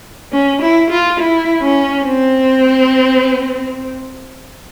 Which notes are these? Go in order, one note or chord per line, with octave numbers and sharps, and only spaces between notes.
C#4
E4
F4
E4
C#4
C4